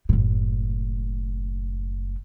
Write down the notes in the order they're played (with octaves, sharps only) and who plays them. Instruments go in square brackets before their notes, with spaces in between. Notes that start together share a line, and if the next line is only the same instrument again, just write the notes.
[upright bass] F#1 A2